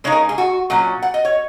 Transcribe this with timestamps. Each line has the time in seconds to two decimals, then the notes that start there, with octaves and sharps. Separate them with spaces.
0.04 C#3 G#3 D#4 C#5
0.12 A#4
0.29 G#4
0.38 F#4
0.70 A#2 F#3 C#4
1.02 F#5
1.14 D#5
1.25 C#5